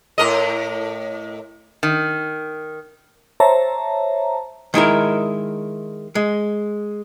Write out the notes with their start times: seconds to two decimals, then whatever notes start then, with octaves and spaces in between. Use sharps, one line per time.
0.18 A2 A#4 D#5
1.83 D#3
3.40 C5 C#5 E5 A5 A#5
4.74 D#3 G#3 E4 A#4
6.15 G#3